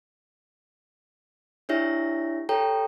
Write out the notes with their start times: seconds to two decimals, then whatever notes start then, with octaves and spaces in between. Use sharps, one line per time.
1.69 D4 E4 G4 C#5 E5 A#6
2.49 G4 A4 C#5 G5 A#5